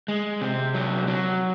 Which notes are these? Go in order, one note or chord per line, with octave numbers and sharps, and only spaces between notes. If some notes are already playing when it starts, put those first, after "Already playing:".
G#3
C3
F#3
F#3